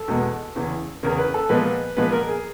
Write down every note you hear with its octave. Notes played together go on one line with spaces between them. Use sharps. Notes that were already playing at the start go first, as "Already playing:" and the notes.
Already playing: A4
E2 B2 G#3 B3
E2 C#3 E3
E2 C#3 E3 A#4
B4
A4
A#2 F3 G#3 B3 B4
A#2 F3 G#3 B3 B4
A#4
G#4